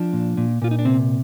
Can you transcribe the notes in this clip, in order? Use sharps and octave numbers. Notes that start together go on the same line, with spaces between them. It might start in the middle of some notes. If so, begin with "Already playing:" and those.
Already playing: F3 D4
A#2
A#2
A#2 F4
D#4
D4
C3 C4